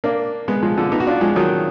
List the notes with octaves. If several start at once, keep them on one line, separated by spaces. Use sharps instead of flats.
A#3 D4
G#3 B3
F3 G#3
D3 F3
B3 D#4
F#4
D4 F4
F3 G#3
D#3 F#3